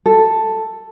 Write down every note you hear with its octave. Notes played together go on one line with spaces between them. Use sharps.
A4